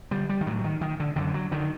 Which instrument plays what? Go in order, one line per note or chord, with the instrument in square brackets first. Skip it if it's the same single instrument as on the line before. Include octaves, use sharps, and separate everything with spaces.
[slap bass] D3 G3
G3
D#3
A2 F#3
D#3
D#3
D3
F#2 D3
F#3
D3 D#3